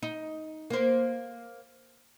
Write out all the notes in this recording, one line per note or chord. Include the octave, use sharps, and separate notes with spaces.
D#4
A#3 C5